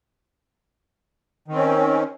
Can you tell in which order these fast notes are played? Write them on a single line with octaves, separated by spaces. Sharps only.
D#3 C4 C#4